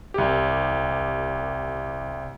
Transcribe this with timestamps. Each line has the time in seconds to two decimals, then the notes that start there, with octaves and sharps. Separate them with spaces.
0.14 C2 G4